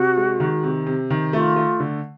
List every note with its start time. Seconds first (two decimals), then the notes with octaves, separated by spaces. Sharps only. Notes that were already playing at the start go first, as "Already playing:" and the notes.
Already playing: C3 F#4
0.17 G#3
0.40 D#3
0.64 C3
0.87 C3
1.10 D#3
1.33 A3 F4
1.56 A3
1.80 D3